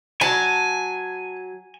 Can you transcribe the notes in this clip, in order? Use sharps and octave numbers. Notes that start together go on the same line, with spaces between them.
F#3 G#5 A5